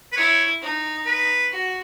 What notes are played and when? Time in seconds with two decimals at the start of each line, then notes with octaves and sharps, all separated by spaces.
0.12 B4
0.17 E4 C#5
0.62 D#4
1.06 B4
1.52 F#4